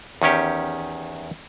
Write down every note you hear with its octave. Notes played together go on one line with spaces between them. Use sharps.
E2 D#3 C#4 G4